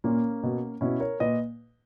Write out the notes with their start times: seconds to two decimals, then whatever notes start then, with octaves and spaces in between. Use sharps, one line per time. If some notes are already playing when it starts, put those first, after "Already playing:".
0.04 A#2 A#3 C#4
0.43 B2
0.81 B2 C#4 E4
1.00 A#4 C#5
1.20 A#2 B4 D#5